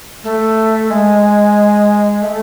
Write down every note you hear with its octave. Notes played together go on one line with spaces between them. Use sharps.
A3
G#3
A3